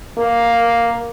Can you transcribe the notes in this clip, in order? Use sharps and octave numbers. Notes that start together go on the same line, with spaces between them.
A#3